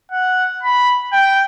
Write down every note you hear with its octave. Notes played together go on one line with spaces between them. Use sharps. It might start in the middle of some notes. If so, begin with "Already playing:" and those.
F#5
B5
G5